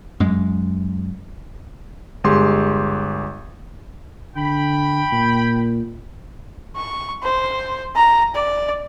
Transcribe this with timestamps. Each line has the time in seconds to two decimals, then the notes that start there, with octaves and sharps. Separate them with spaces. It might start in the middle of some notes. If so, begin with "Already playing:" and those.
0.20 F#2 G#3
2.24 G1 G#3 G4 C6
4.36 D3 G5 B5
5.12 A#2
6.76 C#6
7.23 C5
7.95 A#5
8.34 D5